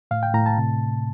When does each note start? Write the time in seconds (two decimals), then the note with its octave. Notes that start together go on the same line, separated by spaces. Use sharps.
0.11 A2 F5
0.23 G5
0.34 A2 A#5
0.46 A5
0.58 C3